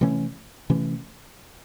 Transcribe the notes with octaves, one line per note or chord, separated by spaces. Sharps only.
C3 E3 A3 C#4
C3 E3 A3 C#4